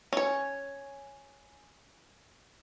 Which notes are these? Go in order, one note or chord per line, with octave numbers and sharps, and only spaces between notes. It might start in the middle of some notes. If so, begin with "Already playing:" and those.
C#4 C#5